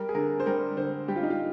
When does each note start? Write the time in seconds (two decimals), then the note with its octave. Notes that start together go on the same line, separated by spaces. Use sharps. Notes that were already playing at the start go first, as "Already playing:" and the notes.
Already playing: G3 A#4
0.09 G#4
0.15 D3 A#4
0.40 C5
0.46 G3 A#4
0.77 D3 C5
1.08 G3 G4
1.16 F4
1.23 D#4
1.30 F4